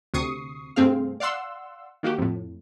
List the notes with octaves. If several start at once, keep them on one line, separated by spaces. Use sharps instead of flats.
D2 C3 C#6 D#6 C7
G2 C3 A3 C4 G#4 F5
D5 F5 F#5 C6 E6
D#3 A#3 F#4 G4
F2 A2